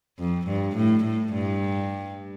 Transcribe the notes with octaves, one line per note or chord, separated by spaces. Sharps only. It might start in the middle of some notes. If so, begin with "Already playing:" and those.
F2
G2
A2
A2
G2